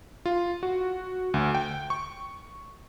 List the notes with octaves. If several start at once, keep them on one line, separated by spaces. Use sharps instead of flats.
F4
F#4
D2
G5
C#6